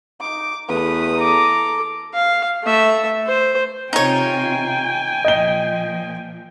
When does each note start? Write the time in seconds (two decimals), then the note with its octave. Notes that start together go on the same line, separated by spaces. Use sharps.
0.21 D#4 D6
0.69 E2 A3 B4 D#6
1.18 A4 A#5 D6
2.14 F5
2.63 A3 E5
3.26 C5
3.93 C3 D#4 F4 C#5 G5 G#5
5.25 A#2 F3 D#5 G7